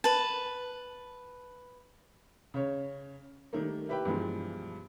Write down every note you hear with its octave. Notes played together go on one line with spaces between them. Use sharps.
B4 A5
C#3 C#5
D#3 G3 A3 A#3
E4 G4 B4 E5 G5
G2 B2 E3 F3 G3 G#3